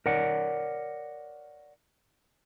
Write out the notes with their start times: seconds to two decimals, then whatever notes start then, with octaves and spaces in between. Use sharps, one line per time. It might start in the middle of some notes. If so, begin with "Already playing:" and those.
0.06 A#4 C#5 D5 F#5